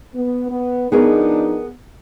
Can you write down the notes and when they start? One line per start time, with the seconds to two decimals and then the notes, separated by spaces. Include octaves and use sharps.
0.14 B3
0.49 B3
0.92 F3 B3 D4 D#4 G#4 A#4